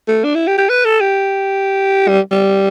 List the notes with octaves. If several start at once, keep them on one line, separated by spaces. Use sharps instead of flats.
A3
D4
E4
G4
G4
B4
A4
G4
G3
G3